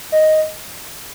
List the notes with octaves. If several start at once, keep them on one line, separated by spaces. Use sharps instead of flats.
D#5